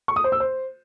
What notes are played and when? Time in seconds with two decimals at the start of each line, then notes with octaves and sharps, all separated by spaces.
0.08 C#6
0.16 D#6
0.24 C5
0.32 E6
0.40 C5